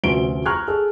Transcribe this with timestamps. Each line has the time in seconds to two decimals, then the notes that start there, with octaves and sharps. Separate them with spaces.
0.03 F1 D2 C#4 F#4 D7 G7
0.46 A#5 C#6 F6 F#6 G#6
0.68 G#4 A4